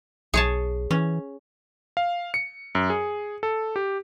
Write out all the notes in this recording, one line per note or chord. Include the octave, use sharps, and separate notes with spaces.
B1 G#4 C#5 A5
E3 C#4
F5
C#7
F#2
G#4
A4
G4